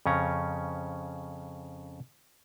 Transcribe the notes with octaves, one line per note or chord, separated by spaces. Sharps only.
F2 C#3 C#4 A#5